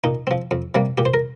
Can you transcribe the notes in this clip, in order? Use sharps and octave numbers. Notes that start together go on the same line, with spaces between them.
A#2 D#4
F3 C4
F2
C3 G3 A#3
A#2 G4
C5
A#4